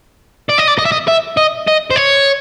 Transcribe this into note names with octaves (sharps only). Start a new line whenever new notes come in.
D5
D#5
D5
D#5
E5
D#5
E5
D#5
D#5
C5
C#5